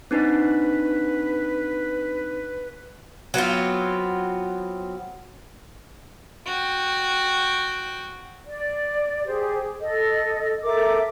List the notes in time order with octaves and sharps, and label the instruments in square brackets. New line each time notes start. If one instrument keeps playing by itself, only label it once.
[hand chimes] C4 D4 D#4 [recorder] B4
[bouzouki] F#3 B3 C4 F4
[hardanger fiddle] F#4 G5
[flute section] D5
G4 G#4 C5
A4 D#5
A4 A#4 E5 D6